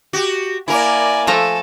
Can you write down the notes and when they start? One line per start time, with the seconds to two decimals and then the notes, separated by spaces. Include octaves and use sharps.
0.13 F#4 G4
0.68 A#3 E4 A#4 D5 G#5
1.27 F3 A3 A4 A#5